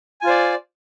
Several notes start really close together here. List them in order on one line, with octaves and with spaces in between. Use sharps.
G#5 F4 C5 D5